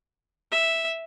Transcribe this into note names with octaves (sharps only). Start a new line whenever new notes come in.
E5